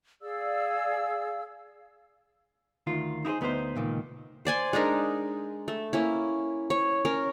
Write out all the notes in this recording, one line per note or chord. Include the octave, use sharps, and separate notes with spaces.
G#4 D5 F5 E6
D2 D#3 F4
D#4 E4 G4 G#4 C5
D2 B3 D#4 G4 C5
C#2 A#2 D#3
C5 D5 G#5 C6
G#3 D4 D#4 A#4
A3
A#3 C#4 E4
C#5
C#4 A#4